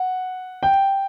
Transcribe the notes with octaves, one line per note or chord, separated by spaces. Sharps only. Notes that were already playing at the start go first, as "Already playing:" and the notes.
Already playing: F#5
G5